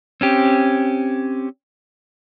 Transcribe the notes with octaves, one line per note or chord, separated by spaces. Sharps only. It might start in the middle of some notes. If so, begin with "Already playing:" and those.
C4 C#4 G4